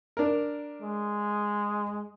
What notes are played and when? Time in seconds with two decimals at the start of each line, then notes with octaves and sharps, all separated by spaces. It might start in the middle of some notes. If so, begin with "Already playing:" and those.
0.17 D4 A#4
0.82 G#3